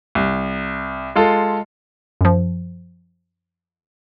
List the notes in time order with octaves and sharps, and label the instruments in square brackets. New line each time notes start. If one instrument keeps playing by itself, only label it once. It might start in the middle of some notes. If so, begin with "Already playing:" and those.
[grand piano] C2
G#3 F4 A4
[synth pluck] F#2 F3